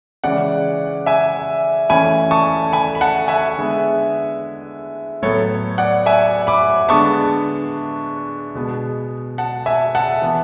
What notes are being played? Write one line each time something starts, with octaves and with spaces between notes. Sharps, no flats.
C#3 E3 G#3 C#4 D5 F#5
E5 G#5
E3 A3 C#4 G#5 B5
A5 C#6
G#5 B5
B5
F#5 A5
E5 G#5
D3 G#3 B3
A2 F#3 B3 A4 C#5
D5 F#5
E5 G#5
B5 D6
D3 G#3 B3 A5 C#6
B2 G#3 B3
F#5 A5
E5 G#5
F#5 A5
E3 B3